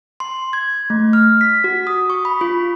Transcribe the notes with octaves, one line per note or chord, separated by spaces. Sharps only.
C6
G#6
A3
F6
B6
F#4
D#6
C#6
B5
F4